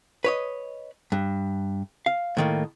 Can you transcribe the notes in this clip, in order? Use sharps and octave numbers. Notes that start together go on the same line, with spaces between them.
B4 C#5 D#5
G2
F5
A2 D#3 A#3